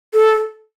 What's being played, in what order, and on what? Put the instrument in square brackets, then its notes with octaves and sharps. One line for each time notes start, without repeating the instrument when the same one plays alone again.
[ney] A4